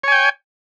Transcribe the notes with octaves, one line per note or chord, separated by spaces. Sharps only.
C#5 G5 G#5